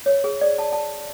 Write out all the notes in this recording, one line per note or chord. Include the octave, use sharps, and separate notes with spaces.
C#5
G#4
D5
A5
A5